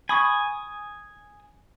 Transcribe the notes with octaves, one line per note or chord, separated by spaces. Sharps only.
G#5 B5 C#6 D#6